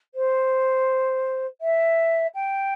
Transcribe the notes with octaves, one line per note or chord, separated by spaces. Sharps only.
C5
E5
G5